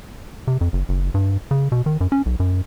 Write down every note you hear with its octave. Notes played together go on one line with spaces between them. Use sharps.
C3
F2
F#1
F#1
G2
C#3
B2
D#3
F#2
C#4
B1
F#2